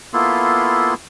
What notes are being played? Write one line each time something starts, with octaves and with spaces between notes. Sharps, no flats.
A#3 B3 E4 F4 A4 C6